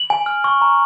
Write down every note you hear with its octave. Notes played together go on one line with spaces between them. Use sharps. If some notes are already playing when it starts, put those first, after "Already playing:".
Already playing: F#7
G#5
F6
C#6
A#5